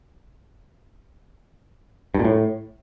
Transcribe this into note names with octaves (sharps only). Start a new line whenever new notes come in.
G2
A#2
A2